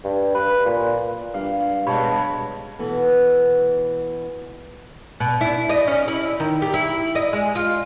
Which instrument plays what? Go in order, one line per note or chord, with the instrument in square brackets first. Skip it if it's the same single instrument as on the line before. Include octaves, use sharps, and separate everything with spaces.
[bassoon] G2
B4
A#2
[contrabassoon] G2 [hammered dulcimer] F5
[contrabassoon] G2 [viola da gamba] B2 G#3 [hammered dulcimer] C#5 [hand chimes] A5 B5
[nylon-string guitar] B2 E3 B3 A4
[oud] B2
E4
D#5
C#4
E4
D#3
G4
E4
D#5
G#3
F4